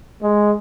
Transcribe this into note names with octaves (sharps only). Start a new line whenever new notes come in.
G#3